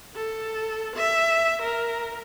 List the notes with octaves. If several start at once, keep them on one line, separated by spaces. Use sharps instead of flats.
A4
E5
A#4